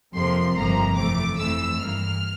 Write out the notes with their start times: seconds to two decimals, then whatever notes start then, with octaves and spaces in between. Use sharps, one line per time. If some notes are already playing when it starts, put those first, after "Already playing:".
0.15 F2 C3 F3 A#3 C6
0.57 G1 F2 C3 F3 A#3 A#5
0.97 F2 E3 A3 D6
1.38 F2 E3 A3 E6
1.78 G2 E3 A#3 F6